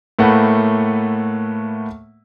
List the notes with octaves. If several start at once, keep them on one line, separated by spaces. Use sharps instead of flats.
A2 A3 A#3 B4 F#5